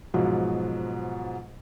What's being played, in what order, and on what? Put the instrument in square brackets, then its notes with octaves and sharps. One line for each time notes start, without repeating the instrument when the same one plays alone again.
[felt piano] G#2 B2 F3 F#3